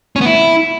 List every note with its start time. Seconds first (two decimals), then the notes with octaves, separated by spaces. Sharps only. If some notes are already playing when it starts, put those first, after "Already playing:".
0.16 C#4
0.21 B3
0.26 E4